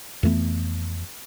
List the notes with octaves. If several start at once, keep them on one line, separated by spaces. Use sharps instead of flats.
F2 E3 A3 B3